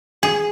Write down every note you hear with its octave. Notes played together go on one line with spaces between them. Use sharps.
G#4